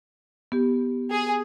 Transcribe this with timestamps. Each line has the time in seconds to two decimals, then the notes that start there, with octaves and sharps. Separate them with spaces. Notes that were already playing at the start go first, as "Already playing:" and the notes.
0.52 B3 G4
1.12 G#4